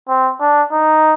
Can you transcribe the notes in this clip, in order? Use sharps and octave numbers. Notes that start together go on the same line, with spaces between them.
C4
D4
D#4